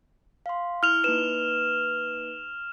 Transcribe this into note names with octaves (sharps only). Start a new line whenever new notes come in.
F5 C6
E4 F6 F7
A#3 D#4 B4 E7